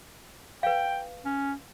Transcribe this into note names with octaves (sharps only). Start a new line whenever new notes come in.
B4 F5 G5
C#4